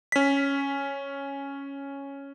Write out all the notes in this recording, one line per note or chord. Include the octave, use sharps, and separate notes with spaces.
C#4 B6